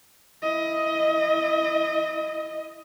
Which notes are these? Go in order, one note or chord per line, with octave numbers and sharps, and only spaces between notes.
E4 D#5